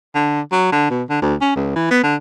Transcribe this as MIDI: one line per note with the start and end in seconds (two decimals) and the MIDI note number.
0.15 0.40 50
0.52 0.71 54
0.72 0.90 50
0.90 1.03 47
1.09 1.19 50
1.22 1.35 38
1.41 1.54 61
1.56 1.74 37
1.75 1.88 52
1.91 2.02 59
2.03 2.15 50